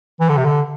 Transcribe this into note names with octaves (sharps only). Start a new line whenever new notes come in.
E3
D3
C3
D3